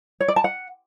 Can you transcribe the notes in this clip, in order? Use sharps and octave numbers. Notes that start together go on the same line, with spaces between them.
C#5
D5
A5
F#5